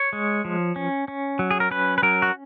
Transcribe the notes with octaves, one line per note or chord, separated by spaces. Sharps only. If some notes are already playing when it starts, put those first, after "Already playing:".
Already playing: C#5
G#3
F3
C#4
C#4
F#3
G#4
A#4
C#4 B4
B4
F#3 A#4
F#4